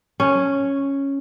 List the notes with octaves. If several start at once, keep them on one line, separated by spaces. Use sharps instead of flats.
C#4